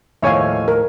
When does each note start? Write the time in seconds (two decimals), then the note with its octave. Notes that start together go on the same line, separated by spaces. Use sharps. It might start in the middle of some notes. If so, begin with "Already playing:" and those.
0.22 D#2 A2 F3 C#5 E5 F5 G#5
0.68 A#4